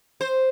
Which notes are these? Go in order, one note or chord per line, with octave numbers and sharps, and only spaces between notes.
C5